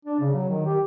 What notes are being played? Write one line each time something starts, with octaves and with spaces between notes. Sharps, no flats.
D4
C#3
F#3
D#3
G4